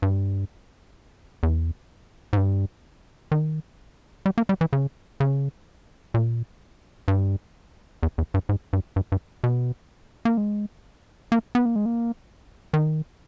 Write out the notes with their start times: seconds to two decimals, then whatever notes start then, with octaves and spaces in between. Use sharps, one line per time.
0.02 G2
1.43 E2
2.33 G#2
2.37 G2
3.32 D#3
4.26 G3
4.38 A#3
4.49 G3
4.61 E3
4.73 C#3
5.20 C#3
6.14 A#2
7.08 G2
8.03 E2
8.18 E2
8.34 G2
8.49 G#2
8.73 G2
8.96 G2
9.12 G2
9.44 B2
10.25 A#3
10.37 G#3
11.32 A#3
11.55 B3
11.65 A#3
11.76 G#3
11.86 A#3
12.74 D#3